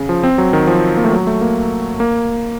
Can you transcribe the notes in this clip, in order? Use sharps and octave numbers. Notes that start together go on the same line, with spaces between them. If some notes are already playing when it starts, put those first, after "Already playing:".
Already playing: C#3
F3
C4
F#3
D#3
F3
A#3
A3
F#3
A3
A#3
A#3